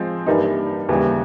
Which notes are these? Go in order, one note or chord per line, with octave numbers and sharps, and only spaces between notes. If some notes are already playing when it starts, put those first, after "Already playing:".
Already playing: F3 G#3 C4
G2 E3 G3 A#3 D#4
D#2 C#3 E3 G3